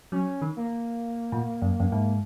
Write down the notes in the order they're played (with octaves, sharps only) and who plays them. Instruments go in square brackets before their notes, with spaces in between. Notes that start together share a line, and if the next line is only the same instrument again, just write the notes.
[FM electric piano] F#3 [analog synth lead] C#4
[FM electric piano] D#3
[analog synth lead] A#3
[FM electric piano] A#2
F#2
F#2
G#2